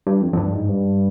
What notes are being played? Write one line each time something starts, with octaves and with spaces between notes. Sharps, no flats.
G2
F2
F2
G2
G#2
G2